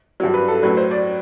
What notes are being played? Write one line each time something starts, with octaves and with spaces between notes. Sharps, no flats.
G2 F#3
B4
A4
A2 F#3 B4
C5
D5